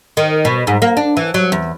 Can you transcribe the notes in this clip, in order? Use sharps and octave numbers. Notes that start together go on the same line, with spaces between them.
D#3
B2
G#2
A#3
D4
E3
F#3
E2